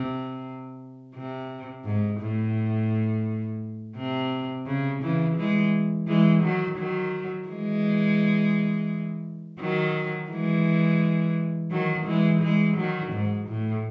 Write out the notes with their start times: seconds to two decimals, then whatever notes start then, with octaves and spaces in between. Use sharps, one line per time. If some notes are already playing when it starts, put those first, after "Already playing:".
Already playing: C3
1.15 C3
1.85 G#2
2.20 A2
3.96 C3
4.67 C#3
5.02 C#3 E3
5.37 E3 G#3
6.08 E3 G#3
6.43 D#3 F#3
6.78 D#3 F#3
7.49 E3 G#3
9.60 D#3 F#3
10.31 E3 G#3
11.71 D#3 F#3
12.07 E3 G#3
12.42 E3 G#3
12.77 D#3 F#3
13.12 G#2
13.48 A2